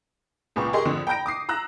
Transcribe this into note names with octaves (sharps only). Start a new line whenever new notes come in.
C#2 A#2 B4 C#6
G4 G#4 A#4 D#5 C6 C#6
F2 D3
G5 A#5 B5 G6 A#6 D7
D6 D#6 C7
A#5 E6 F#6 A#6